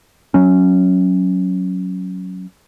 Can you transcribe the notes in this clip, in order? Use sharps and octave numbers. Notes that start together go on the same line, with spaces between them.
F#3 C#4